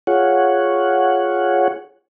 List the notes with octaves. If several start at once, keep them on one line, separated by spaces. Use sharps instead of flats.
F4 G#4 C#5 F#5